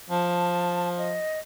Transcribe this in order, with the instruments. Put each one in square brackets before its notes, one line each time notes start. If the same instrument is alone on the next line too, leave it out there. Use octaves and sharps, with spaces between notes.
[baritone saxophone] F3 [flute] A5
[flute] D#5